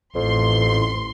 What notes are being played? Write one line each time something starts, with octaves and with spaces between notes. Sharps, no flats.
A1 F2 C6